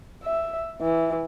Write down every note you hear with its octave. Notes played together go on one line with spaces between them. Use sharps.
E5
E3